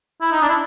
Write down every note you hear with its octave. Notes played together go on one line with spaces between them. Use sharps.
E4
D#4
D4
E4